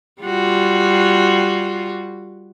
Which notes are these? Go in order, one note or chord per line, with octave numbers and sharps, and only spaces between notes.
G3 F4 F#4